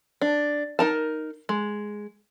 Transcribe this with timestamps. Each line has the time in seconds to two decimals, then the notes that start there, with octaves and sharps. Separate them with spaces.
0.21 D4
0.79 D#4 A#4 A5
1.49 G#3